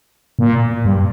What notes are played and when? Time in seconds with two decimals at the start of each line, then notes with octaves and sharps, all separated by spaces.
0.39 A#2
0.85 G2